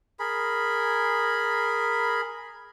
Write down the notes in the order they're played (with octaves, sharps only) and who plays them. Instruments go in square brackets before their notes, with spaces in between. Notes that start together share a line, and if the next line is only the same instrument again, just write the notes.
[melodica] G#4 A#4 B5